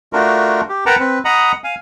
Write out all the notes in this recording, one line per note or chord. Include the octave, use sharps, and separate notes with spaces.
A3 D4 F4 F#4 A#4
G4
A#4 B4 F#5 G5 A5 A#5
C4 B4
D#5 F#5 A#5 B5 D#6
F5 G#5